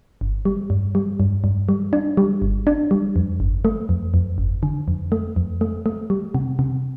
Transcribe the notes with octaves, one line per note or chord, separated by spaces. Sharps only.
G1
G3
G2
G3
G2
G2
G3
D4
G3
G1
D4
G3
F2
G1
A3
F2
F2
G1
D3
F2
A3
F2
A3
A3
G3
C3
C3